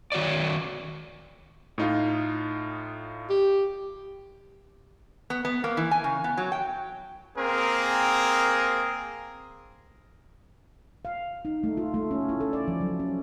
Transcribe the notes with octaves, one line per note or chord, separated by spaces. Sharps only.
D#3 F#4 C#5 D5
A2 D#4 F4
G4
B3
B3
A#3
E3
G#5
C#3
B3
F#3
G5
A#3 C4 G#4 A#4
F5
D#4
A3
F4
A3
C#4
E4
A4
D5
F3
F#3
C#4